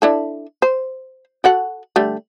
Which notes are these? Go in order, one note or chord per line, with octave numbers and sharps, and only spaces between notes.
D4 E4 A4
C5
F#4 A4 F#5
D3 G3 A3